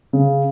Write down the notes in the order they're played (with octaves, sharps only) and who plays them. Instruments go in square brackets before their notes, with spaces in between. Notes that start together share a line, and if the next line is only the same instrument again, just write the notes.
[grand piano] C#3